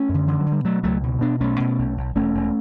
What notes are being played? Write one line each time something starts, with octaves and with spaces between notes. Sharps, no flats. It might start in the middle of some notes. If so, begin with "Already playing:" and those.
Already playing: A3 C#4
F#2
D3
D3 E3
F#3
D3
G3
B2 F#3 A3
C#2 F#3 A3
B2
B2 B3 D4
B1 A3 C#4
B2
B1
B1
E1 A3 C#4
E1